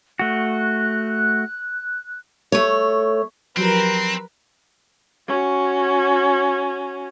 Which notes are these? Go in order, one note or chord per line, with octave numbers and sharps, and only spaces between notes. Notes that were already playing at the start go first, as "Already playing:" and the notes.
A3 F#4 F#6
A3 C#5
F3 F#3 C4 G4 A#4 B4
C#4 F#4